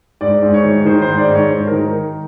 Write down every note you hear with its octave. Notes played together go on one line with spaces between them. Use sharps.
G#2 D5
G#2
C#5
D#3
D#3 C5
C5
G#2
D5
G#2
C#5
G#2 C5
D#3 A#4